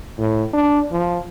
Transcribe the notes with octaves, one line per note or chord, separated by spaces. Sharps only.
A2
D4
F3